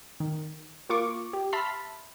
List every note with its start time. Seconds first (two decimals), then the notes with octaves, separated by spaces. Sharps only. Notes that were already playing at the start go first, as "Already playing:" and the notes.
0.20 D#3
0.89 A#3 F4 C#6 D6
1.33 G4
1.53 E5 A5 B5 C6 F6 B6